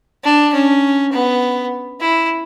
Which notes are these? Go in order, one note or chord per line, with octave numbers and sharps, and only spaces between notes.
D4
C#4
B3
E4